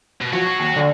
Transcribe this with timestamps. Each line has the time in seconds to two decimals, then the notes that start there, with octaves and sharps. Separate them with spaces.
0.21 B2
0.33 F3 F#3 F#4 C#5
0.47 C7
0.59 D#2
0.76 D3